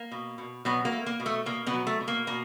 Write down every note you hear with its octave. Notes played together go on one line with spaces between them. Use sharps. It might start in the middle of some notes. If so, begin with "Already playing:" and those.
Already playing: A#3
B2
B2
B2 F#3 B3
A#3
A3
A#3
B2
A3
B2 A#3
B2 B3
F#3
A3
B2
A#3
B2 A#3